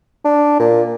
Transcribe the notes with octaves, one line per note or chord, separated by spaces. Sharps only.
D4
A#2